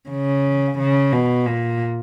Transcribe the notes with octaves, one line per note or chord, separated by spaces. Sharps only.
C#3
C#3
B2
A#2